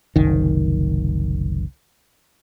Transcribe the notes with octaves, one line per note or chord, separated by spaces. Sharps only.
F#1 C2 D#3